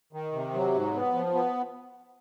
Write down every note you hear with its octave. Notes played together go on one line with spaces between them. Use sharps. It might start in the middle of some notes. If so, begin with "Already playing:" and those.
D#3
C3
F#3
G#2
B3
F3
B3